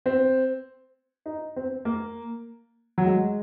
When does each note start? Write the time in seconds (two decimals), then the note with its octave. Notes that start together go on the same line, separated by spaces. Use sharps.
0.06 C4
1.26 D#4
1.56 C4
1.85 A#3
2.98 F#3
3.05 G#3